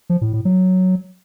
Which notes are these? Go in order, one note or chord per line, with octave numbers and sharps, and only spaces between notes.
F3
A2
A2
F#3